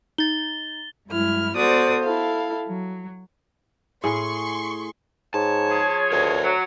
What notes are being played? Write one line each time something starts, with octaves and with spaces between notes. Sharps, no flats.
D#4 A6 G7
G2 F#3 G#3 E4 F6
B3 F#4 A4 C5 D5 D#6
E4 A4 F5
F#3
A2 G#4 C6 C#6
G#2 C#5 A5
F3 G#4
D2 A#4 B4 A5
F#3